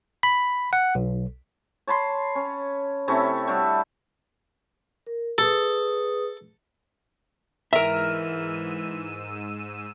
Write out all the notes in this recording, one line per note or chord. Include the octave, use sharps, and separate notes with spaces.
B5
F#5
B1
C#5 A5 B5 C6
C#4
C3 A3 C#4 E4
G3 D4 F#4 E5
A#4
G#4 A4 B4 D#6
G#2 E3 A#4 E5 A#5 E6 D#7